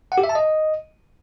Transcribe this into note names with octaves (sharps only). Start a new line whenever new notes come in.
F#5
G4
E5
A5
D#5